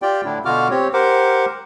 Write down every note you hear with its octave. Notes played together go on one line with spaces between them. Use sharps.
F4 G4 D5 G5
A2 D3 D4 E4
B2 D3 F4 F#4 D6 F6
C4 G4 C#5
G4 A#4 C5 F#5 D6